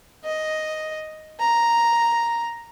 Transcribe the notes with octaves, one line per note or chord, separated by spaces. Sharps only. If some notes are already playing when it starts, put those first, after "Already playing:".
D#5
A#5